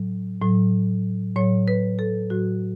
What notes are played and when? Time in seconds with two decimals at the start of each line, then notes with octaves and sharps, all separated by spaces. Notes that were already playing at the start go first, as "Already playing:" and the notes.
Already playing: A2 F#3
0.42 A2 F#3
1.36 A2 F#3 C#5
1.68 B4
1.99 A4
2.30 A2 F#3 F#4